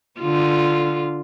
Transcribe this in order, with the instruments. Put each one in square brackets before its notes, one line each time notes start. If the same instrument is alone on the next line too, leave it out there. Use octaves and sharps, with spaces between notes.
[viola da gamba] D3 F4